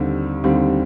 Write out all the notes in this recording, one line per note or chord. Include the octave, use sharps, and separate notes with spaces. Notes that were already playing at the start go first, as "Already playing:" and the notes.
Already playing: D#2 D3 G3 C4
D#2 D3 G3 C4